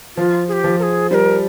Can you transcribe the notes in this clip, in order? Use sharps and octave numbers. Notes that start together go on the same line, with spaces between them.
F3 F4
G#4
G4
F3
A#4
G#4
G3 A#4 C5